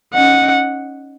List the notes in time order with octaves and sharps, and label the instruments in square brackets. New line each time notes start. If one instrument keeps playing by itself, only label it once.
[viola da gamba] C#4 D#4 [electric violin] F#5